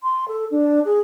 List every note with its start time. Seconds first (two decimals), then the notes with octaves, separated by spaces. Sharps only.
0.03 C6
0.28 A4
0.51 D4
0.85 G#4